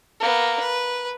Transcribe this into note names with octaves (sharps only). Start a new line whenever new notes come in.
A#3 B3
B4